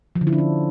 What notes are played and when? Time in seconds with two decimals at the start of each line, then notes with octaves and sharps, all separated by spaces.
0.15 F3
0.21 D3
0.27 E4
0.33 D4
0.38 C#4